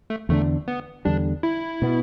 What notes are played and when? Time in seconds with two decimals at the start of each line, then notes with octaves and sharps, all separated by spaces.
0.10 A3
0.29 E2 D3 A3 B3 D4
0.68 B3
1.05 E2 D3 G3 D4
1.43 E4
1.82 B2 B3